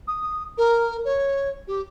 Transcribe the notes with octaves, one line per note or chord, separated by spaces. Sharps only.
D#6
A#4
C#5
G4